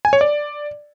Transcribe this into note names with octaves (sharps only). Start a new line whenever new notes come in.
G#5
C#5
D5